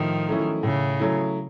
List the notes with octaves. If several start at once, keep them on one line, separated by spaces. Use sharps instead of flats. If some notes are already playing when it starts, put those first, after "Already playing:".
Already playing: A2 D#3 F3
F#3 A3 C#4 E4
A2 C#3
F#3 A3 C#4 E4